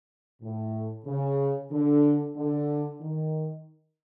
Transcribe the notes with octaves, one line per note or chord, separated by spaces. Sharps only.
A2
C#3
D3
D3
D#3